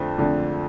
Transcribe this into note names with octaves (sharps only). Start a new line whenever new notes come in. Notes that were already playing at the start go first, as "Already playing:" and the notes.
Already playing: F2 D3 A3 C5
F2 D3 A3 D4